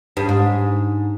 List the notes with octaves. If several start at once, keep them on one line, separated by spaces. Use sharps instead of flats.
G2
G#2